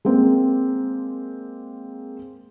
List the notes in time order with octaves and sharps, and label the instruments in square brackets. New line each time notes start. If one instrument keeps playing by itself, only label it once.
[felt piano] G#3 A#3 C4